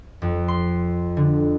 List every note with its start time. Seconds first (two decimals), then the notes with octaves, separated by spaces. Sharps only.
0.22 F2
0.48 C6
1.17 D3